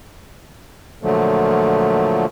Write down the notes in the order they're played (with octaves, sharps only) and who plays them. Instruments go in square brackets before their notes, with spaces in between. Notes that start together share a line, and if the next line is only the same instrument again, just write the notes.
[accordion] A#2 D3 F3 F#3 A3